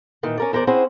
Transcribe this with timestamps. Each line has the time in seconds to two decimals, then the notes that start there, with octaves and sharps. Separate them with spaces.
0.23 A#2 D#3 E3
0.38 C#4 A#4 D5
0.53 E2 A#4 C5 D5
0.67 C4 C#4 E4 G#4 C5 F#5